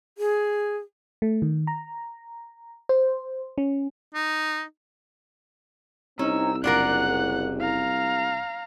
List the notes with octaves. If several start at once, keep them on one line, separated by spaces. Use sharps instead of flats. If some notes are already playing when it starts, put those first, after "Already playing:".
G#4
A3
D#3
A#5
C5
C#4
D#4
C2 C4 C#4 D#4 A#5 E6
F#1 D4 F4 A#4 F#5 F#6
F5 A#5